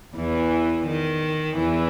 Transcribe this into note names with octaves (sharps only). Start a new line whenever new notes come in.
E2 E3
D#3
E2 E3